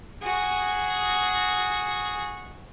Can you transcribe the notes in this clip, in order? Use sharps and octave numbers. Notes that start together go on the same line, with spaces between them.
F#4 G#4